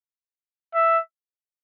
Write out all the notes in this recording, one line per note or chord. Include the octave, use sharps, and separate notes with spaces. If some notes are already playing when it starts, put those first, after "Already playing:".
E5